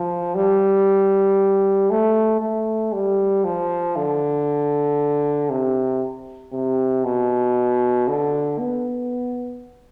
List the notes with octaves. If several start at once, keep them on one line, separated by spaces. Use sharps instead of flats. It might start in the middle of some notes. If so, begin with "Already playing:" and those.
Already playing: F3
G3
A3
A3
G3
F3
D3
C3
C3
B2
D3
B3